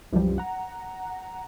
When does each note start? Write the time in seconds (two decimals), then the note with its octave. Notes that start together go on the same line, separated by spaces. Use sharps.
0.13 C2 F#2 C3 E3 F3 G3
0.38 F#5 A#5